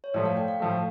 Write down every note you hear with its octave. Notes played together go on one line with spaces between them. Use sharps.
C#5
A2 F3 A3 D5
F5
G5
F5
A2 F3 A3